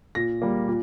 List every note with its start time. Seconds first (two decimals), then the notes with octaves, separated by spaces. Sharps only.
0.15 A#2 A#6
0.42 G3 A#3
0.68 A#2